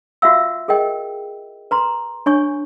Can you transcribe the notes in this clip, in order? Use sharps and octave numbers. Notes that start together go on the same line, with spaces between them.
F4 F#4 E5 F5 E6
G#4 A#4 D#5 G5
B4 A#5 C6
D4 C#5 G#5 C#6